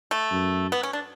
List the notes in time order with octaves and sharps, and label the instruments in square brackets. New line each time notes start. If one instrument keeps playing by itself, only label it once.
[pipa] A3
[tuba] F#2
[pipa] B3
C#4
D4